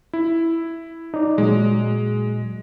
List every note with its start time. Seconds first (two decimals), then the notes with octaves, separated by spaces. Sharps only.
0.13 E4
1.14 D#4 D5
1.38 A#2 F#3 G#3